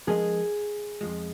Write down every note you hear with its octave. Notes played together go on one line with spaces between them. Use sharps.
F3 G#3 C#4 G#4 A#4 D#5
F2 F3 G#3